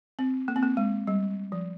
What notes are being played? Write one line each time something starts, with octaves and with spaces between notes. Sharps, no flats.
C4
A#3
C4
A#3
G#3
G3
F3